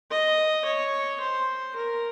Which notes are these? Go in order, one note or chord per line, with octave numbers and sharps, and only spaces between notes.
D#5
C#5
C5
A#4